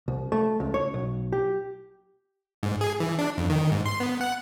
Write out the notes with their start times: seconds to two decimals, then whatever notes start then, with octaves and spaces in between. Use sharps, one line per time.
0.08 C2
0.32 A3
0.60 C#2
0.74 C#5
0.94 B1
1.32 G4
2.63 G#2
2.81 G#4
3.00 E3
3.19 D4
3.38 F2
3.50 D#3
3.72 G#2
3.86 C6
4.00 B3
4.21 F#5